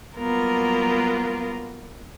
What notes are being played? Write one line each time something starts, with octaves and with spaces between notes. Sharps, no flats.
F#3 G3 A#3 B3 F4 A#4